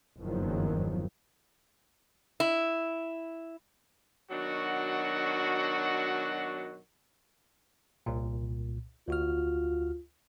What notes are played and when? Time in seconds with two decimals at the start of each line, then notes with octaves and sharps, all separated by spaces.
0.21 F#1 E2 G2 D#3 F3 F#3
2.40 E4
4.31 B2 D#3 F#3 D4 F#4
8.06 C2 A#2
9.08 D2 F4 F#4 F6